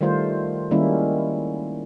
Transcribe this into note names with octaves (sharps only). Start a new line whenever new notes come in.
D#3 G3 A3 F4 C5
D#3 G3 G#3 A#3 C#4 E4